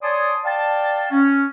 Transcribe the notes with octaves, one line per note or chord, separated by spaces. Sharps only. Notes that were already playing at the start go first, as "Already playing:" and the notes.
C#5 D5 G#5 A5 C6 D#6
D5 F5 G5 A5
C#4